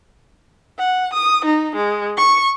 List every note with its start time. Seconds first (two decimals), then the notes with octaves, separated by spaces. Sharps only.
0.79 F#5
1.13 D#6
1.45 D#4
1.76 G#3
2.17 C#6